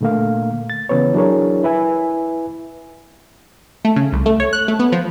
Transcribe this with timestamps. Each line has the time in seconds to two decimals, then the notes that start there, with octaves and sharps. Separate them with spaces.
0.01 A#2 D3 A3 A#3 F5
0.70 A6
0.89 C#3 E3 B3 B4 C#5
1.14 F#3 D4 E4 G#4 A#4 C#5
1.63 E4 B4 E5 G#5
3.85 A3
3.96 C#3
4.12 C2
4.26 A3
4.40 C#5
4.53 F#6
4.68 A3
4.79 B3
4.92 F3